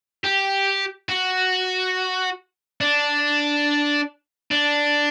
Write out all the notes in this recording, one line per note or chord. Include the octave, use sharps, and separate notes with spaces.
G4
F#4
D4
D4